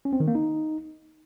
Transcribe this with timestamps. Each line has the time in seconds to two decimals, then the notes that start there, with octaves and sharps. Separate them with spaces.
0.05 C#4
0.13 C4
0.20 D#3
0.28 A#3
0.35 D#4